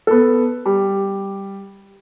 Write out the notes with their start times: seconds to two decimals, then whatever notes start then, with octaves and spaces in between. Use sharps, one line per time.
0.07 B3 A4
0.66 G3